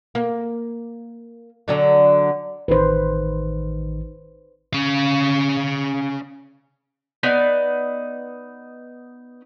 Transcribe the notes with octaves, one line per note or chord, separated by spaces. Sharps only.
A#3
D3 F#3 D4
A1 D#3 D#4 B4 C5
C#4 F5
B3 D#4 D5